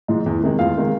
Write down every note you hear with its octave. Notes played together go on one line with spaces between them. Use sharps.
G#2 F3 G#3
E2
C3 D#3 G#3
E2 F4 F5
C3 D#3 G#3